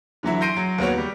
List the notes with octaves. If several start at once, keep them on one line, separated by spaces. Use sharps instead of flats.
D3 E3 F#3 E4
C6 G6 A#6 C7 D7 D#7
F#3
D#2 B3 F#4 C#5
G3